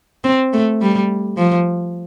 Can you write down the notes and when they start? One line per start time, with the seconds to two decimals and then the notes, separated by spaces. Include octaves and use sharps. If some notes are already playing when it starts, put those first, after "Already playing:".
0.24 C4
0.53 A3
0.82 G3
1.38 F3